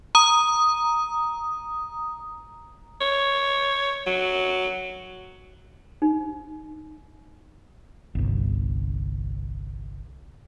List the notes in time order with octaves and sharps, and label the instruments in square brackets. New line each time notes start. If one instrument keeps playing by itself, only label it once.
[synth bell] A#5 D#6
[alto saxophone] C#5
F#3
[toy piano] D#4
[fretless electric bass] G1 C2